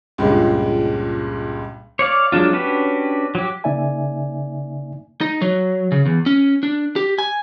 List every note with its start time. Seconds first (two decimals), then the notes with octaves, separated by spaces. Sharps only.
0.18 C#2 G2 A#2 G#3
1.99 C#5 D5 F5
2.32 F#3 G#3 D4 F4
2.53 C#4 D4 F#4 G4 B4
3.35 F#3 G4
3.64 C#3 A#3 D#4 D5 E5 G#5
5.21 D#4
5.42 F#3
5.92 C#3
6.06 E2
6.26 C#4
6.63 D4
6.96 G4
7.18 G#5